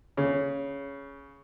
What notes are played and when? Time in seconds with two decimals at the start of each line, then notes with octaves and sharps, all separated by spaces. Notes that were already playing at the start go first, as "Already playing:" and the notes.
0.17 C#3